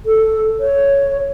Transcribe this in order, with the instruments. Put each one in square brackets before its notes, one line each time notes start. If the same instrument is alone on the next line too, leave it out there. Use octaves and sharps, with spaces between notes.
[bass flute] A4
C#5